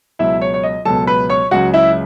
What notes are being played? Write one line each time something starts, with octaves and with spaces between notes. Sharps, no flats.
C#2 B2 F#3 E4 E5
C#5
C#5
D#5
C#2 B2 F#3 A4 A5
B4 B5
C#5 C#6
C#2 C#3 F#3 F#4 F#5
E4 E5